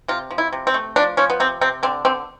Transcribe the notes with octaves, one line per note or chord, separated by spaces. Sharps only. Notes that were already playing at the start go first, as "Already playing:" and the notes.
C3 F4
F3
E4
C3
C4
A3
F3 D4
F3 C#4
B3
C3 C4
C3 C4
D3 C4
D3 C4